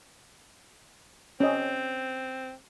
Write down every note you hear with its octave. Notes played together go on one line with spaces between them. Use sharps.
C4 C#4 D#5